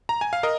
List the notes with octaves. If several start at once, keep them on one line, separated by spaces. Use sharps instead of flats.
A#5
G#5
F5
A#4 D#5